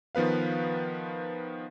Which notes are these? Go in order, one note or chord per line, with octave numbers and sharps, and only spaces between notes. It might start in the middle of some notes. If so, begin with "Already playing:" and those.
D#3 F3 B3 B4 F5